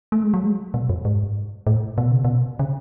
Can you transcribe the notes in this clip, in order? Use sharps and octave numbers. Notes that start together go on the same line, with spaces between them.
A3
G#3
F#3
G#3
B2
F#2
G#2
A2
B2
C#3
B2
C#3